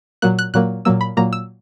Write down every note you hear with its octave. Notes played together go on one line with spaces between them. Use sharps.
A#2 F#3 A#3 F#6
F#6
A#2 F#3 A#3 F#6
A#2 F#3 A#3 E6
B5
A#2 F#3 A#3 A#5
E6